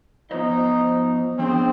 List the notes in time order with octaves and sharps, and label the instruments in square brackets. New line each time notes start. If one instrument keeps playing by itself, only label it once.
[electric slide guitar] F3 B3 F4 C5 D#5 [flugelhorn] D#4
[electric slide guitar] F3 B3 D4 G#4 C5 [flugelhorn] C4